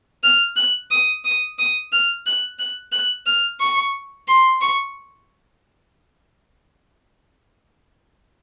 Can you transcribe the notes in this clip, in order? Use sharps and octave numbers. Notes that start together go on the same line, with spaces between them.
F6
F#6
D#6
D#6
D#6
F6
F#6
F#6
F#6
F6
C#6
C6
C#6